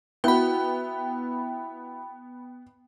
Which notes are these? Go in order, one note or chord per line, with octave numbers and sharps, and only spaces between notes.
B3 E4 F#4 G5 B5